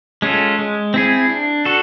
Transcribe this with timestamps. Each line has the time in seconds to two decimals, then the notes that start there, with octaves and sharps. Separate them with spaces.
0.22 G#3 C#4 F4 A4
0.59 G#3
0.94 C4 E4 G#4
1.29 D4
1.65 F#4 A4